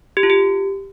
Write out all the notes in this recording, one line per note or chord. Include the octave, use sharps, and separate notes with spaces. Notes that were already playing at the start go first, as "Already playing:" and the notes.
G4
F4
G4